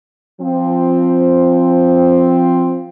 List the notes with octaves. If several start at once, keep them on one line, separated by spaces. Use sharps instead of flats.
F3 C4